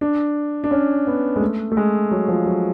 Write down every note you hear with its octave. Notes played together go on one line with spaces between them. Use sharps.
D4
D4
C#4
B3
G#3
A3
A3
G#3
F#3
F3
F#3